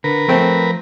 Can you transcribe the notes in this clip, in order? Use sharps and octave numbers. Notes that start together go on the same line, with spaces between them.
D3 A#4 B4
F3 A3 C4 C5